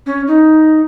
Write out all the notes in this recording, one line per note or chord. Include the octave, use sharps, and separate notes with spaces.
C#4
D#4